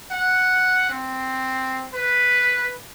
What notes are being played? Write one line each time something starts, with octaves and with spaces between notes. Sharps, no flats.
F#5
C4
B4